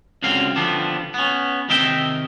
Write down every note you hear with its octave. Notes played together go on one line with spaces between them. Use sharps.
C#2 F#2 D3 C4 F5
D3 F3 G3 B3 D4
B3 C#4
C3 D#3 D#4 A#4 E5 G5